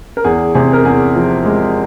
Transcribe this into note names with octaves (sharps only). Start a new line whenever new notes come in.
A#4
E2 G#4
C3 G#4
A#4
E2 G#4
F3
G#3